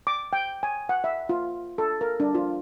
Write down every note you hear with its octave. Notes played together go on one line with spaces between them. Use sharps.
D6
G5
G#5
F#5
E5
F4
A4
A#4
D4
F4